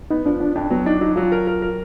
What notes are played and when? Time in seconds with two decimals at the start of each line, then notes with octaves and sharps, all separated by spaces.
0.11 B3 D#4
0.25 F3 D4
0.40 F3 D4
0.55 F2 D4
0.70 F#3 B3
0.86 D4 D#4
1.01 F#3 D#4
1.16 F#3 F4
1.32 A#4
1.47 A#4
1.62 A#4